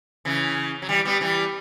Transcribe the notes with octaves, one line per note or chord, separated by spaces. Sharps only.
C#3 E3
F#3
E3 G3
G3 B3
E3 G3